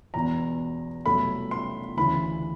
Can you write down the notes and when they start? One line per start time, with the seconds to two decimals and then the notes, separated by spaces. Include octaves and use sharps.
0.14 E1 E2 B2 A#5
1.06 C2 B2 F#3 A3 B5
1.51 C6
1.97 D2 C#3 E3 B5